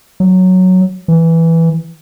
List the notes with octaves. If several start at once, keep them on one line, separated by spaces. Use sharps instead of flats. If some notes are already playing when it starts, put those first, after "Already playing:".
F#3
E3